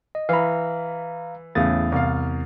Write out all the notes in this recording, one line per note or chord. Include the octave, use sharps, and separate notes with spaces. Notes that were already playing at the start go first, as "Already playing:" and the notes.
D#5
E3 F5 A#5 B5
E2 A2 C#3 D#6 A6
C2 F5